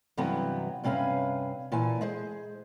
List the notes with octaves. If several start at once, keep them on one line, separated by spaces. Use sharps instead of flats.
G2 C3 E3 F#3 B3
G2 C3 C#4 B4 F5
A#2 E3 G#5 A5
G#3 G#4 C5